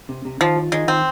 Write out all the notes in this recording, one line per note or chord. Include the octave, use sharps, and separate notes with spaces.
C3
C3
D#3 F3
F4
D#3 G#3
D#3 C4